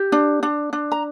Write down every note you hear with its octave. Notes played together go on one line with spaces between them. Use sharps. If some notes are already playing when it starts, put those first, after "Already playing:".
Already playing: G4
D4
D4
D4
A#5